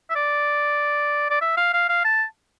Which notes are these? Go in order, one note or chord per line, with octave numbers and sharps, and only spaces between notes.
E5
D5
D5
E5
F5
F5
F5
A5